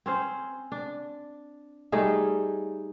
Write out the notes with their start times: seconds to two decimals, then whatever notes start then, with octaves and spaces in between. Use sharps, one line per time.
0.06 C4 C#4 C5
0.72 D4
1.92 G3 A3 D#4 G#4